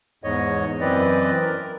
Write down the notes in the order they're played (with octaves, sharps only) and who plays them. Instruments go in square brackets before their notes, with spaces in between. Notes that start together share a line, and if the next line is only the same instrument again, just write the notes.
[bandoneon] E2 G#2 C#5 D#5
F#2 E3 C4 B4 D5 D#5
A#4